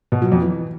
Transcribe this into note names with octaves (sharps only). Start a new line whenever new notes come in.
B2
F#3
F2
E3